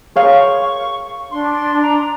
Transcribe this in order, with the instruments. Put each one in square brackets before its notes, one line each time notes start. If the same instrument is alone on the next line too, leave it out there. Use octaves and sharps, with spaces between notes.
[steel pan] G#4 C#5 F5 [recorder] C#6
[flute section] D4 [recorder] C6
[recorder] A#5